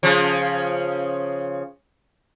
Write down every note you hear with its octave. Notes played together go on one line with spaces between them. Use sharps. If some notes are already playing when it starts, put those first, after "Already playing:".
C#3 F3